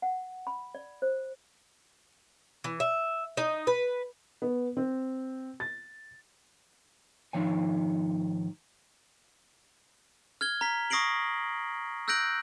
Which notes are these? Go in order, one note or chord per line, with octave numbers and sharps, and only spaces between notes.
F#5
B5
D5
C5
E3
E5
D#4
B4
B3
C4
A6
G#2 D#3 F3 C#5 G#5
F6 G#6 G7
A#5 B6
C#6 D#6 A#6 C7 D7 F#7
E6 F#6 G6 A#6 D7 F#7